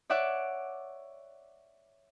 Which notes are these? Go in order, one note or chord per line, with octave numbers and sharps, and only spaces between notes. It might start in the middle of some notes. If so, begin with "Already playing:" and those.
C#5 D5 E5 F#5 D6